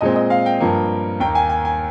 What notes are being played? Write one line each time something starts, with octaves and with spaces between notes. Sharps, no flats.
A#2 G#3 C4 D#5
D#5
F5
G5
G2 F3 A#3
D#2 D#3 A#3 G5
G#5
G#5
G#5